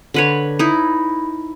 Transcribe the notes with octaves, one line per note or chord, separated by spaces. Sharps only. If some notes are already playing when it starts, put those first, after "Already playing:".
D3 B4 C#5
D#4 E4